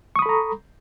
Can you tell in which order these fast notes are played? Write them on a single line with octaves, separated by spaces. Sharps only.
C#6 D#6 B5 A4 A#5